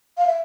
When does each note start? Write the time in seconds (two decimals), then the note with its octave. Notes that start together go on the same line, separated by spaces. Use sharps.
0.18 F5
0.27 E5